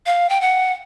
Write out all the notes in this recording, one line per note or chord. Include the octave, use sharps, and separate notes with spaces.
F5
G5
F#5